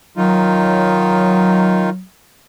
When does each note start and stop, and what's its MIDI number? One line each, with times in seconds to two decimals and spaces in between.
0.17 1.90 51
0.17 2.02 54
0.17 1.90 63
0.17 1.90 65